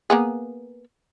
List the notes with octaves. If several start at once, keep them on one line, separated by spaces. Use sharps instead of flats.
A#3 B3 G#4